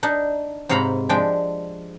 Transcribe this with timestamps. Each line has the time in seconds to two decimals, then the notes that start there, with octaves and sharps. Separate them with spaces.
0.03 D4 D#4
0.69 G#2 C3 C#5 F5 A#5 B5
1.09 F3 G#3 D4 G5